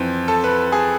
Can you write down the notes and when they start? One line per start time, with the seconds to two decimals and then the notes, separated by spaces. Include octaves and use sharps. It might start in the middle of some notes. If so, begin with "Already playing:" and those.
Already playing: F2 E3 C4
0.28 A4
0.44 B4
0.72 G#4